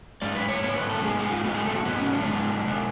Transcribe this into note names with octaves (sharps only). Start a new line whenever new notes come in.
G#2 G#3 D5
B4
C#5
G#2 G#3 B3 C#5
B4
A4
G#2 G#3 B3 G#4
G#4
F4
G#2 G#3 B3 F#4
G#4
A4
F#4
G#2 G#3 B3 F#4
C#4
D4
G#2 G#3 B3
B2 G#3 B3